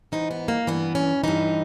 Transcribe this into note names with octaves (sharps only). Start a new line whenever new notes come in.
G#2 E3 D#4
B3
A#3
G2 E3 B3
C#4
G2 E3 D#4